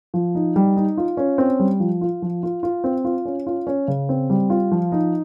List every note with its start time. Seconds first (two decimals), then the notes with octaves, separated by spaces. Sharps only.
0.14 F3
0.35 D#4
0.56 G3
0.76 D#4
0.97 F4
1.17 C#4
1.38 C4
1.60 G3
1.80 F3
2.01 F4
2.22 F3
2.43 F4
2.63 F4
2.84 C4
3.05 F4
3.25 C#4
3.47 F4
3.67 C#4
3.88 C#3
4.09 C4
4.30 G3
4.50 F4
4.72 F3
4.92 D#4